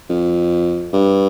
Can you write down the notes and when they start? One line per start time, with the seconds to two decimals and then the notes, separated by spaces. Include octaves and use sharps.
0.09 F2
0.93 G2